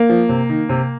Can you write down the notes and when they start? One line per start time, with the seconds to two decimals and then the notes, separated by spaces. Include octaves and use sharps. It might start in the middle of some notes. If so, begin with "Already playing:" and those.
Already playing: A#3
0.09 F3
0.29 C3
0.49 D#3
0.69 C3